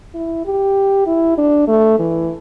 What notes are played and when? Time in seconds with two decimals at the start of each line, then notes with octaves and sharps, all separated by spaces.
0.15 E4
0.46 G4
1.07 E4
1.38 D4
1.68 A3
1.99 E3